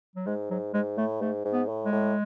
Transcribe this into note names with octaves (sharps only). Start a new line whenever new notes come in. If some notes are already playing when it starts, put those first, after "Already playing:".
F#3
G#2 G#3
G#2 F#3
G#2 G#3
A2 A3
G#2 A3
G#2
B3
A2
G#3
A2